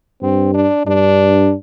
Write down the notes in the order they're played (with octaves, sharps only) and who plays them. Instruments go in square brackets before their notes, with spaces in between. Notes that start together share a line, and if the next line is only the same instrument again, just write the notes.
[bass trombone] G2 [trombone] C4
[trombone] D4
[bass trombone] G2 [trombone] D4